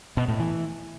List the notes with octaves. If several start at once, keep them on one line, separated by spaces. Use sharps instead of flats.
B2
A2
E3